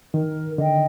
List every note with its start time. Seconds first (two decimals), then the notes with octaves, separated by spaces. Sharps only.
0.14 D#3 A#4
0.58 D3 D#5 G5